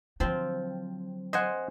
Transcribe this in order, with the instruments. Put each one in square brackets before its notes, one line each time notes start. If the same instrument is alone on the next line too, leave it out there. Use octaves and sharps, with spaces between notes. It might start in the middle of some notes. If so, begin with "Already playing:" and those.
[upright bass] D3 F#3 [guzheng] F3 C4
[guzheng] C5 G#5 [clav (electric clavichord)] D#5 F#5